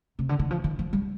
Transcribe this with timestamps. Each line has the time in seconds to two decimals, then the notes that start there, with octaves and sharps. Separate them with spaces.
0.19 C3
0.29 D3
0.39 D#3
0.51 F3
0.64 D#3
0.79 F3
0.93 G3